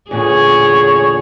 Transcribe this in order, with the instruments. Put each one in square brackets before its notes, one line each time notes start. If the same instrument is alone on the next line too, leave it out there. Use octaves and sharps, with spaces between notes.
[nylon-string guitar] E2 A#2 D3 [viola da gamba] G#4 [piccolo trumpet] C#5